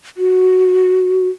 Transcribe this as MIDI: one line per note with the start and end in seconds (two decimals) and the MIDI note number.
0.17 1.28 66